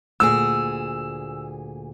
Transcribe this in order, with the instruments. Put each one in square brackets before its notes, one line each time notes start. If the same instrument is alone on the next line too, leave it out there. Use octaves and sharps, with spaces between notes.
[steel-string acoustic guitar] D2 A#2 G#4 [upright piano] E6